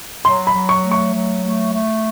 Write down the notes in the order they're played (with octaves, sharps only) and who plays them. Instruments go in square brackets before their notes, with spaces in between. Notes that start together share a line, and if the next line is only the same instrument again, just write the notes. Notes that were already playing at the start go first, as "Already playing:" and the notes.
[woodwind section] F#3 [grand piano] C6
[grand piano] B5
[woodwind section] F#3
[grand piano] C#6
[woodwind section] A3
[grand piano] C#6
[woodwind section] F#3
A3
A3